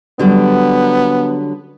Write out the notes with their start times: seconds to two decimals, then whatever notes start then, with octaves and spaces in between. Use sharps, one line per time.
0.19 D3 F#3 G3 B3